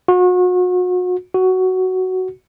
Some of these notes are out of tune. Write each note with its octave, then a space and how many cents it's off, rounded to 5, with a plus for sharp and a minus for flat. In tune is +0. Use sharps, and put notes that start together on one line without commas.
F#4 -35
F#4 +10